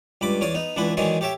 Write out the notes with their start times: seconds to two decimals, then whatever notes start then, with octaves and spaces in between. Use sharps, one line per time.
0.21 C#2 G2 B5 D6
0.41 E2 C#5 D5 D6 D#6
0.55 B3 D#4
0.76 C#2 E3 D4 E4 F#5 B5
0.97 D#3 E3 F#3 G#3 G#4 D5
1.21 G4 A4 C#5 E5 G5